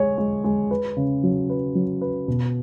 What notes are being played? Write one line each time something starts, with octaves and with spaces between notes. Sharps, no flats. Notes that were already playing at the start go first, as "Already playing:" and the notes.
Already playing: G#3 C#5
G#3
G#3
B4
C#3
F#3
B4
F#3
B4
B2